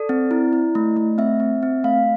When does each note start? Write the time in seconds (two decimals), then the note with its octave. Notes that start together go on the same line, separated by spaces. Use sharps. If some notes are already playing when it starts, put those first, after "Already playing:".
Already playing: A4 D5
0.09 C4
0.31 E4
0.53 E4
0.75 A3
0.97 A3
1.18 C4 E5
1.40 C4
1.63 C4
1.84 A3 F5